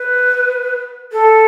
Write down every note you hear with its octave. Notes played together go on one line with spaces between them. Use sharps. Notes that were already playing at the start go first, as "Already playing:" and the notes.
Already playing: B4
A4